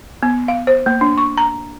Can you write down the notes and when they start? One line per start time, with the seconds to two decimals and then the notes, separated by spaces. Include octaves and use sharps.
0.23 B3
0.48 F5
0.67 C5
0.86 A#3
1.01 D4
1.18 C#6
1.37 A#5